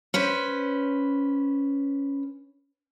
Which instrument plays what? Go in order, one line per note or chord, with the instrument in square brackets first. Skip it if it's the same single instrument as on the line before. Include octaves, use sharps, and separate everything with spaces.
[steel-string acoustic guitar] C#4 B4 C5